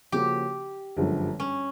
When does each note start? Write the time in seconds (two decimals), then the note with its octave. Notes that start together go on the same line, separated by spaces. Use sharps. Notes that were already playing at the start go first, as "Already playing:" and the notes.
0.12 C#3 F3 A#3 C#4 F#4 G4
0.97 G1 F#2 D3 F3 G#3
1.40 C#4